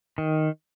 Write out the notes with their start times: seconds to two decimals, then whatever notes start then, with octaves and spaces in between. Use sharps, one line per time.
0.18 D#3